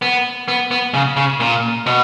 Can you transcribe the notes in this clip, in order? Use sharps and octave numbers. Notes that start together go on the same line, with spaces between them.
B3
B3
B3
C#3
C#3
A#2
B2